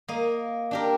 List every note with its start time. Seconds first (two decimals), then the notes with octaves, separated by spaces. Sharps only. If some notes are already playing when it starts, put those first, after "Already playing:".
0.08 A#3 D#5
0.71 D4 G4 A#4